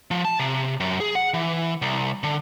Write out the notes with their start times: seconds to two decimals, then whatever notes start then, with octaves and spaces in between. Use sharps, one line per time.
0.11 F3
0.25 A5
0.39 C3
0.80 F#2
1.00 G#4
1.15 F#5
1.34 E3
1.82 C2
2.23 D3